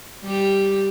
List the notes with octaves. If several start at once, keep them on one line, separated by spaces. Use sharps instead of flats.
G3 G4